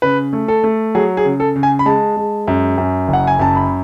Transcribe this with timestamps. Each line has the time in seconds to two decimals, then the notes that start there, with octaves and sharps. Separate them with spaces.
0.02 C#3 B4
0.33 A3
0.48 A4
0.64 A3
0.95 F#3 G#4
1.17 G#4
1.25 C#3
1.40 A4
1.56 C#3
1.63 G#5
1.79 B5
1.86 G#3 A5
2.17 G#3
2.48 F#2
2.78 F#2
3.08 F#1
3.13 F#5
3.27 G#5
3.39 F#2 A5
3.56 B5